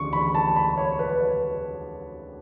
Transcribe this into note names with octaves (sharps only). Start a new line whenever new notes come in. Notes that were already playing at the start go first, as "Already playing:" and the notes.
Already playing: D2 C#3 E3 C#6
B5
A5
B5
C#5
B4
C#5